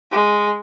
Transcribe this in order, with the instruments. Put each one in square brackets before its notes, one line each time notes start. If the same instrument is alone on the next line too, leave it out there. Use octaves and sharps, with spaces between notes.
[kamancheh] G#3